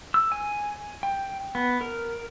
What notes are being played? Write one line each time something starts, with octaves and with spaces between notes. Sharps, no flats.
E6
G#5
G5
B3
A#4